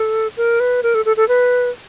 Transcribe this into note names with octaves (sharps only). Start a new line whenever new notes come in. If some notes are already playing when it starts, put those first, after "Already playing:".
Already playing: A4
A#4
B4
A#4
A4
A4
A4
B4